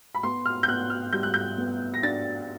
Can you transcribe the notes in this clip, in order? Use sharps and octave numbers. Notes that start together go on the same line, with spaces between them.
B5
B3 C6
F6
G6
B3 F#6
F6
G3 G6
F#6
G6
B3
A#6
D4 A6